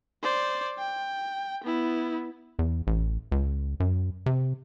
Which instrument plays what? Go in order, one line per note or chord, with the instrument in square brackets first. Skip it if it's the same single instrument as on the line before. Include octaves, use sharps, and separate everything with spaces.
[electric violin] C5 D5
G5
B3 E4
[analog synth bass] E2
A1
C#2
F#2
C3